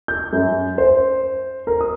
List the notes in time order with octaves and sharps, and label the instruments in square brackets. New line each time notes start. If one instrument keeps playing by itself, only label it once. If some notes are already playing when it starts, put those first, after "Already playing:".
[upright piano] G6
F#2
C5
A#4
D#6